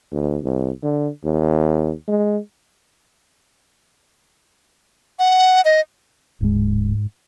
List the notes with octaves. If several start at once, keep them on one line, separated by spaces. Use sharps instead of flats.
D2
C2
D3
D#2
G#3
F#5
D#5
D1 G#2 G#3